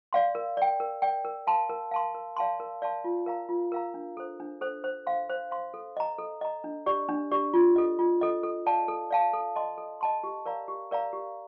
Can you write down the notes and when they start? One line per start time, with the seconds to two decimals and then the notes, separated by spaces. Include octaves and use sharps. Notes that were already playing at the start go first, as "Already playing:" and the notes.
0.13 D5 F5 C6
0.35 A#4
0.57 D5 G5
0.80 A#4
1.02 D5 G5
1.25 A#4
1.47 F5 A5 C6
1.70 A#4
1.92 F5 A5 C6
2.15 A#4
2.37 D5 F5 A5 C6
2.60 A#4
2.82 D5 F5 A5 C6
3.04 F4
3.26 A#4 F5 A#5
3.49 F4
3.72 A#4 F5 A#5
3.94 D4
4.17 A4 C5
4.40 D4
4.61 A4 C5
4.84 C5
5.07 F5 C6
5.29 C5
5.51 F5 C6
5.74 A4
5.97 D#5 A#5
6.18 A4
6.41 D#5 A#5
6.64 D4
6.86 G4 D5
7.09 D4
7.31 G4 D5
7.54 F4
7.76 A4 D#5
7.99 F4
8.21 A4 D#5
8.43 A4
8.66 D5 F5 A5
8.88 A4
9.11 D5 F5 A5
9.33 A4
9.56 D#5 A5 C6
9.78 A4
10.01 D#5 A5 C6
10.24 G4
10.46 A#4 D5 F5 A#5
10.68 G4
10.91 A#4 D5 F5 A#5
11.13 G4